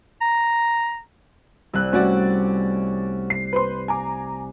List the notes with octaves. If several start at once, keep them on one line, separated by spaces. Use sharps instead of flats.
A#5
C2 E6 F#6
A3 C#4 F#4 D5
C7
B4 C5 C6
G#5 A#5 D6